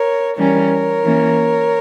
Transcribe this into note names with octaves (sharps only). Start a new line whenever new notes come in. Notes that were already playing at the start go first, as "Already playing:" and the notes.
Already playing: A#4 C#5
E3 G3 C#4 A#4 C#5
E3 A#3 C#4